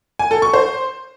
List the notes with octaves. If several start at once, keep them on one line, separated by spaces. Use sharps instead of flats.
G#5
A4
C#6
C5